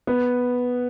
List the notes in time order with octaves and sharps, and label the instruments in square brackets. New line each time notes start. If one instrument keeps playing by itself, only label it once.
[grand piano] B3